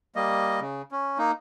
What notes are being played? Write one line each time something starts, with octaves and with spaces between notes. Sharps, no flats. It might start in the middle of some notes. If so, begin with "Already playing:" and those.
G3 A#3 D#5
C#3
C#4
A#3 D#4